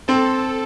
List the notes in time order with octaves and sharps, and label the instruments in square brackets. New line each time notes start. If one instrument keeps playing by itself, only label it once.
[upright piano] C4 [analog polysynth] A4